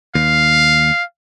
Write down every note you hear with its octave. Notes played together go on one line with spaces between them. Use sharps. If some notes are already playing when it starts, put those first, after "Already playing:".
D#2 F5